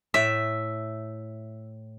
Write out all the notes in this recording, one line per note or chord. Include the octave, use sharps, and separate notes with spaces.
A2 E5